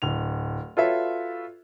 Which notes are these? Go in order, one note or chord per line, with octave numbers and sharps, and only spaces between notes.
D1 F7
F4 F#4 A4 B4 C#5 E5